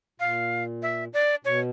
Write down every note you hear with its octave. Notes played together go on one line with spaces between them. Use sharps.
A#2 F5
E5
D5
B2 C#5